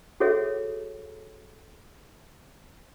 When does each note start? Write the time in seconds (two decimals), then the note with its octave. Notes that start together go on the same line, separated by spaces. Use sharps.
0.20 F#4 G#4 A4 C#5 E5